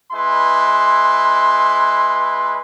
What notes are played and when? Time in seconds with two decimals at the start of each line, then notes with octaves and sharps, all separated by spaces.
0.12 G#3 E4 B4 C6